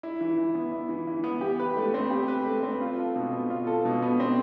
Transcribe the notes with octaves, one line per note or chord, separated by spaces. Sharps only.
E4
E3
E3
B3
E4
E3
E3
B3
G4
B4
A3
C4
G4
B4
A3
C4
F4
A4
B2
B3
F4
A4
B2
B3
C4